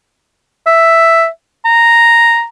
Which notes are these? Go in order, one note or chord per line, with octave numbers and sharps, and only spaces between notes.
E5
A#5